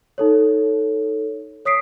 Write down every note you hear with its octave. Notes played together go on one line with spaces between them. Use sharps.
D#4 A4 C#5
C#5 D#6 B6 C7 D7